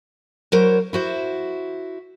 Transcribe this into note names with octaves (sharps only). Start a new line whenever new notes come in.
F#3 E4 A#4 C5 C#5
E4 F#4 C5